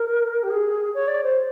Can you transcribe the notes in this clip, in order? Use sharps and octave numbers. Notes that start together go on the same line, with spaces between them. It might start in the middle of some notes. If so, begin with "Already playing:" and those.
Already playing: A#4
G4
G#4
C#5
D5
C5